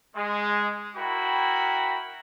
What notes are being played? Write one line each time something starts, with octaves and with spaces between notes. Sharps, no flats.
G#3
E4 F#4 A#4 G5 B5